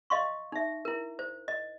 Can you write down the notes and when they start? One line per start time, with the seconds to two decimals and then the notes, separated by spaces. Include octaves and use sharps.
0.10 D#5 F5 C6 C#6
0.52 D#4 E5
0.85 E4 A#4
1.19 C5
1.48 D#5